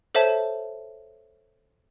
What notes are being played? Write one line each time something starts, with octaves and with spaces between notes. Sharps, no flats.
A4 C5 C#5 E5 A5